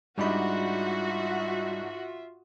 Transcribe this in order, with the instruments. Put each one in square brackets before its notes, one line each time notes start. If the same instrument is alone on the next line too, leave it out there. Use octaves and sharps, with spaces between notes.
[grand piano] G#2 D4 D#4 [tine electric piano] G3 B5 [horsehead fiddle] F4 E5 [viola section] F#4